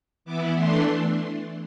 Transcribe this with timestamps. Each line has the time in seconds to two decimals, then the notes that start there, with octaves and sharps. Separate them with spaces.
0.25 E3 B3 E4 D6
0.55 E3 A3 D4 C6